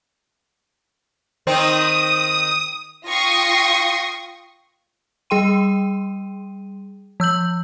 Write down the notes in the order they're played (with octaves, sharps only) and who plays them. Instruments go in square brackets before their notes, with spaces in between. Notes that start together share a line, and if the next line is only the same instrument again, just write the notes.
[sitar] D#3 C4 D#4 [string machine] D#6
[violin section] F4 G5 C#6 D#6 A#6 C7
[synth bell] G3 G#4 G5 C6 D#7
F3 E6 G6 F#7